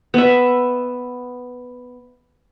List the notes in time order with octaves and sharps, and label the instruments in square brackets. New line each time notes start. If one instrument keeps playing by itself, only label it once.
[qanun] B3 E5